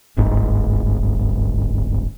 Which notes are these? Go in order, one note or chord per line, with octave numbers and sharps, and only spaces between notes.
D1 G1 G#2